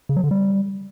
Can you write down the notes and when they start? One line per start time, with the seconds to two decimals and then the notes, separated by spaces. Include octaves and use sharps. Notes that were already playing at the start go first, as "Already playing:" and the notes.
0.09 C#3
0.17 F#3
0.24 D3
0.31 G3